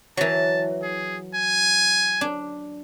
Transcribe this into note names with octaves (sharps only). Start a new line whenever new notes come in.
E3 F#3 A5
G#4
G#5
D4